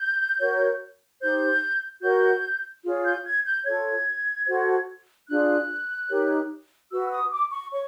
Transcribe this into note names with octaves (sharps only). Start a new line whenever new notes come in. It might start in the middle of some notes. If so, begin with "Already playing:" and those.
Already playing: G6
F#4 A#4 C#5
D#4 G4 C5 G6
F#4 A#4 C#5 G6
F4 G#4 C#5
G6
G#6
G6
F4 A4 C#5 G#6
F#4 A4 C5
D4 F4 G#4 F#6
D#4 G4 A#4 C#5
F#4 B4 E6
D#6
D6
C#6
C#5 C#6